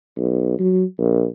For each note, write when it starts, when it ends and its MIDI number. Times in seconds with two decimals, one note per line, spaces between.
0.17 0.56 35
0.59 0.83 54
0.98 1.25 34